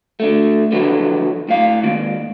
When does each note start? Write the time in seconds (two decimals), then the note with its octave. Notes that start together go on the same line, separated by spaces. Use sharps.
0.20 D3 A3
0.72 D3 F3 F#3 B3 A4
1.49 A2 F5
1.83 D#2 G#2 D#3